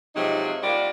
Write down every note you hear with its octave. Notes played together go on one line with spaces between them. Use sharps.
C3 F3 F#3 G#3 D#4
G3 A#3 F4 F#4 D5